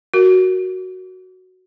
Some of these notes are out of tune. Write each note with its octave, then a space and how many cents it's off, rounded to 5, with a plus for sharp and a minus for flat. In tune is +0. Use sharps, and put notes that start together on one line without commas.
F#4 +0 A#4 +0